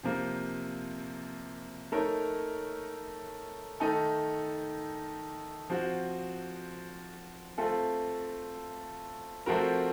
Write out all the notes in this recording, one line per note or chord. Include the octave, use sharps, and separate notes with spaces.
C3 F3 A#3
A3 D#4 A#4 C#5
D#3 A3 D#4 A4
F3 C4 F#4
A3 C4 F4 A4
F3 A3 C4 F#4 A#4